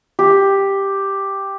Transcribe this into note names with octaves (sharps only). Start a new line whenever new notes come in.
G4